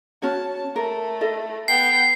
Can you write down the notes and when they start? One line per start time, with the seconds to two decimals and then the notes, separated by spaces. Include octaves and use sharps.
0.22 C#4 F#4 C#5 A5
0.76 A3 A#4
1.21 E4 A4 D#5
1.68 B3 G5 C7